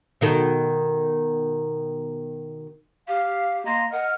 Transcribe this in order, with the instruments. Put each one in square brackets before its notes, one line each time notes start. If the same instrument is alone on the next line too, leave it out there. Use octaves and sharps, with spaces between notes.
[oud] B2 D#3 A4
[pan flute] G4 [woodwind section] F5
[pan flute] A#3 [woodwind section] D#5 A#5 C6
[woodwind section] A#4 D#5 F6 [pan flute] F#5